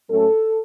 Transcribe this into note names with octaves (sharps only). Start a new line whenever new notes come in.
A2 F#3 A3 C#4 A4